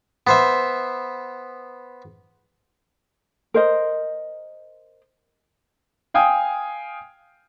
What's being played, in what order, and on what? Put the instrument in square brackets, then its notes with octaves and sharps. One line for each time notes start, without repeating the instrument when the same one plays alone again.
[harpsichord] B3 C5 E5
[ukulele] A#4 C5 D#5
[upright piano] F5 G5 G#5 D#6